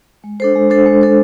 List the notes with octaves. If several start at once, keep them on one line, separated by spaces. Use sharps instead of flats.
G#3
D4 A4 C5
G#3
D4 A4 C5
G#3
D4 A4 C5